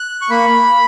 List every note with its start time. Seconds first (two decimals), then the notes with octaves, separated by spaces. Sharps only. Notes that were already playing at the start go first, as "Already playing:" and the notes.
Already playing: F#6
0.22 C#6
0.30 A#3 B5